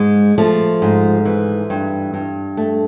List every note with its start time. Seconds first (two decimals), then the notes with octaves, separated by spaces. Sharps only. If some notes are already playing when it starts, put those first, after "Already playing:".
Already playing: G#2 G#3
0.38 F3 A3
0.82 G#2
1.25 E3
1.70 G2
2.14 G2
2.57 A3